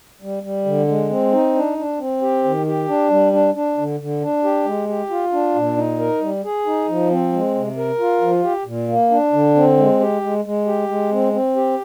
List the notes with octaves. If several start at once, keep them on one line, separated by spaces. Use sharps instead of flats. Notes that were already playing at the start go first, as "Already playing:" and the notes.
G3
G3
D3
G#3
C4
D#4
D4
D4
C4
G4
D#3
G4
D4
G3
D4
D4
D3
D3
D4
G4
G#3
G4
F4
D4
A#2
D#4
A#4
G3
G#4
D#4
F3
C4
G#3
C3
A#4
F4
F3
G4
A#2
A#3
D4
D3
C4
G#3
G4
G#3
G#3
G4
G#3
C4
C4
G4